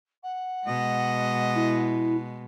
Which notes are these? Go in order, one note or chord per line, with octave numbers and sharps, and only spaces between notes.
F#5
B2 G#3 D#5
E4